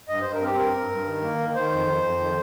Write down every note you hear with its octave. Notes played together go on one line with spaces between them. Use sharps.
G2 D#5
G2 C5
A#4
C4 G4
G2 A#4
G2
G2
D#3
A#3
D#3
D#3 C5
F2
F2
F2
D#3